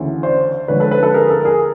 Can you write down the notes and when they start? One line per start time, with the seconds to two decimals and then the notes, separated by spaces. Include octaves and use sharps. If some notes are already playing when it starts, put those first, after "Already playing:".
Already playing: D2 C#3 E3
0.23 C5 D5
0.68 D2 D3 F3 G#3 B4 C#5
0.80 A4 B4
0.91 A4 B4
1.03 A4 B4
1.14 G#4 A#4
1.30 A4
1.45 G#4 A#4